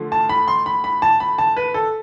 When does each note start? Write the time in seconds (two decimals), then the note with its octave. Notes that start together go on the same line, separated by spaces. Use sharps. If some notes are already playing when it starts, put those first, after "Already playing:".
Already playing: D3 F3 A3
0.12 A5
0.29 B5
0.48 C6
0.66 B5
0.84 B5
1.02 A5
1.20 B5
1.38 A5
1.57 B4
1.74 A4